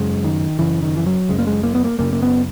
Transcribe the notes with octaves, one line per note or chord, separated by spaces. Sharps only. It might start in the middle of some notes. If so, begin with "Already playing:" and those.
Already playing: F#2 C#3 G#3
D#3
F#2 C#3 E3
D#3
E3
F#3
F#2 C#3 G#3
A#3
G#3
A#3
B3
A#3
F#2 C#3 A#3
A#3
B3